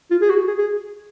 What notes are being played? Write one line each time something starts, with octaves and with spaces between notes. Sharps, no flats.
F4
G#4
F#4
G#4
G#4